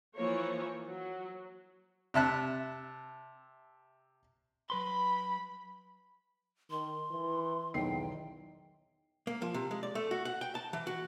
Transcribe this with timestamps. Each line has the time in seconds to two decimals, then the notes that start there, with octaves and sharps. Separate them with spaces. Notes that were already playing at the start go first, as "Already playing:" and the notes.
0.15 E3 F3 A#3 C#5
0.87 F#3
2.14 C3 E5 A5 F#6
4.70 F#3 B4 B5 C6
6.70 D#3 C6
7.11 E3
7.74 B1 E2 D#3 G5 C7
9.27 A#3
9.42 F3
9.54 C3
9.71 G#3
9.83 D5
9.95 A3
10.11 F#4
10.25 F#5
10.41 G5
10.55 A5
10.73 E3
10.87 F#4